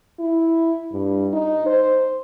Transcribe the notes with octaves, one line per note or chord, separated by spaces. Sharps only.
E4
G2
D#4
C5